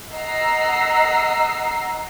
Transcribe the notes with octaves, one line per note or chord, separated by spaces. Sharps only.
D#5 F#5 A#5 E6 C7